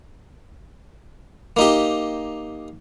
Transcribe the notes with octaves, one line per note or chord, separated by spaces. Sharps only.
A#3 D#4 G4